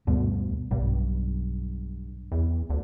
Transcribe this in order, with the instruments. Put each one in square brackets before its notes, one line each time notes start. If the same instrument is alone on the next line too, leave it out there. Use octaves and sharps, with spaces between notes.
[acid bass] D2 [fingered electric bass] G2 B2
[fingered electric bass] B1 [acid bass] G2
[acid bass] E2
D2